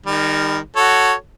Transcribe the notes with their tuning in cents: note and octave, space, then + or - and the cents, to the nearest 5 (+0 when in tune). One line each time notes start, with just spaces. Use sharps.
D#3 -10 G3 +30
F#4 +0 A4 +0 C#5 +0